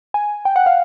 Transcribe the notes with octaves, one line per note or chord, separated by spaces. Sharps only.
G#5
G5
F#5
F5